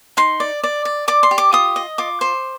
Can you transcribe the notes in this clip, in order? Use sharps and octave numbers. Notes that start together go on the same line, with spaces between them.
D#4 C6
D5
D5
D5
D5 D6
C6
G4
D6
F4 D#6
D#5
F4 D6
C5